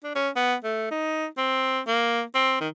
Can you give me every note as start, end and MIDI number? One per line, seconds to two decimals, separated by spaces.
0.04 0.12 62
0.15 0.29 61
0.36 0.54 59
0.64 0.90 57
0.91 1.26 63
1.37 1.80 60
1.87 2.23 58
2.35 2.56 60
2.60 2.68 51